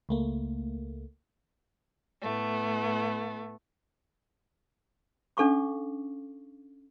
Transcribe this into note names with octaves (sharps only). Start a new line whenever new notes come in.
C#2 A3 A#3
A2 A3 B3
C#4 D4 A4 F5 C#6 D6